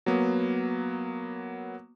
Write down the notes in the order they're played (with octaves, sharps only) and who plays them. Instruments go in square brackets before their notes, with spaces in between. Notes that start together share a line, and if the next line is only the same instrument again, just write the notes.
[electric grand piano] F#3 A#3 B3